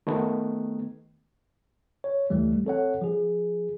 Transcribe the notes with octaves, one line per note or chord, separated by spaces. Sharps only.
D#3 A3 B3
C#5
D2 E3 G3 A3
C4 A4 C#5 F#5
F3 G#4